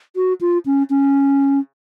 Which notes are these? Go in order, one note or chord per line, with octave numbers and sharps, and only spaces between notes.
F#4
F4
C#4
C#4